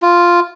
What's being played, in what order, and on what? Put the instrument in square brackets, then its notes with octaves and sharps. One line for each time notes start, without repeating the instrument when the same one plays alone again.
[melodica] F4